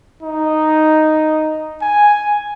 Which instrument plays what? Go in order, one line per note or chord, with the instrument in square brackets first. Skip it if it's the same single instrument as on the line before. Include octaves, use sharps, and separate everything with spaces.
[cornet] D#4
G#5